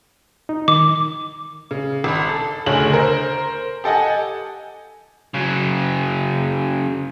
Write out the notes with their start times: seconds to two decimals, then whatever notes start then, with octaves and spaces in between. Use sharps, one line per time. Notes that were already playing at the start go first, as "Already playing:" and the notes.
0.49 D#4
0.68 D#3 D6
1.71 C#3
2.04 G#1 B5
2.29 A4
2.66 F#1 D2 A3 G#4 C#5 F#7
2.93 A#4 C5
3.84 G4 A4 D#5 F#5 G#5
5.34 C#3 F#3